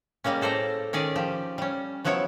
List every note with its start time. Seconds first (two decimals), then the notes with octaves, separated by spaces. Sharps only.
0.24 G3 G#3 A#3 C#4
0.41 A2 A4 C5 D5 A#5
0.93 D#3 C#4 G#4 D5
1.16 F3 G4
1.58 G3 C#4
2.05 F3 F#3 B3 E4 C#5